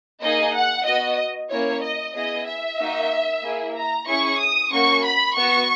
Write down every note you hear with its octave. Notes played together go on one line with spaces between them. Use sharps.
A#3 D#4 G#4 D#5
F#5
B3 F#4 D#5
A#3 C#4 E4 C#5
D#5
B3 E4 G#4 D#5
E5
A#3 D#4 F#4
A#3 E4 G#4
A#5
C#4 E4 G#4 C#6
D#6
A#3 C#4 F#4 C#6
B5
B3 F#4 C#6